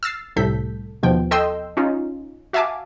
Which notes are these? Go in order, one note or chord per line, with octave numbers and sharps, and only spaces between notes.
E6 F6 A6 C7
C2 A2 A4 G6 B6
D#2 B2 F3 G5
A4 D#5 G5 C6 E6 G6
C#4 D#4 F4
F#4 E5 F5 G#5 A5 D6